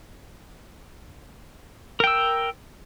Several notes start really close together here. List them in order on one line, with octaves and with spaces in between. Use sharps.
A#4 G5 E6